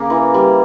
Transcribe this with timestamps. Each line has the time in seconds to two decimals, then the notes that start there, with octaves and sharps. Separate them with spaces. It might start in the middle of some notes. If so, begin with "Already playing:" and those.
Already playing: C#3 A#3
0.10 E3
0.34 G3